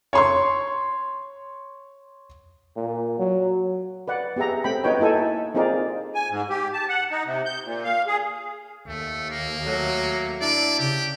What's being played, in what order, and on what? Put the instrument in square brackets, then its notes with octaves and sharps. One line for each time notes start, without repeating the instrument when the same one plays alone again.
[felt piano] C#5 C6 C#6
[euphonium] A#2
F#3
[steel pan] B4 D5 F#5
B3 G4 G#4 E5 A#5
A3 C4 G5 B5
B3 D#4 F#4 B4 C#5 G5
A#3 D#4 E4 A4 G#5
C4 D#4 F4 G#4 A#4 D5
[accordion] G#5
G#2
G4
A5
F#5
D#4
C3
G6
A#2
F5
G#4
[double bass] D#2 [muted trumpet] A3
[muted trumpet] A#3
[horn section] F#3 A3
[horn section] D4 E4 [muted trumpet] D5
[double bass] C#3 [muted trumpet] G4